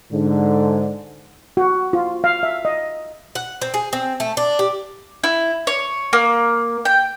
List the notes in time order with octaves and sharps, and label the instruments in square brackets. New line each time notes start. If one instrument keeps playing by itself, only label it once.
[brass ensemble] G#2 D3
[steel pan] F#4
F4
F5
E5
D#5
[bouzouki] F#5
C4
G#4
C4
A3
D4
G4
[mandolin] E4
C#5
A#3
G5